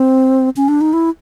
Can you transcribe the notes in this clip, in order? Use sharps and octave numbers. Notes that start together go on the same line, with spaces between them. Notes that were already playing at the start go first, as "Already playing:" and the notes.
Already playing: C4
C#4
D4
D#4
E4